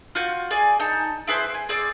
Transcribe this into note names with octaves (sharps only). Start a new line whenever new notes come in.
F4 F#4 G6
G#4 D5 G#5
D#4 A5 G6
E4 G#4 B4 C5
G#5
C4 G#4 D5 E6